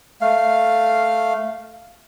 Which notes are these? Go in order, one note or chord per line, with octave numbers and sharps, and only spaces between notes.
A3 F5